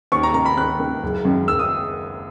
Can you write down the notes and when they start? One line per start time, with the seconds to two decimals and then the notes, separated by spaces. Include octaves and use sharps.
0.12 D#2 C#6
0.23 A#5
0.34 D#3 A#5
0.46 B5
0.57 D#2 F#6
0.80 D#3
1.03 F#1
1.25 F#2 D#3
1.48 F#1 E6
1.59 D#6